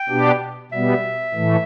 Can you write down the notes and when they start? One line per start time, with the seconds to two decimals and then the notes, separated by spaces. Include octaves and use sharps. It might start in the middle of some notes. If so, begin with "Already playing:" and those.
Already playing: G5
0.09 B2 B3 D4 G4
0.72 B2 G3 B3 E5
1.34 A2 E3 A3